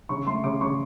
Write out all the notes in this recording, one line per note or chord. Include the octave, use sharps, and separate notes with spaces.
C#3 C#6
A3 C6
C#3 D6
C#3 C#6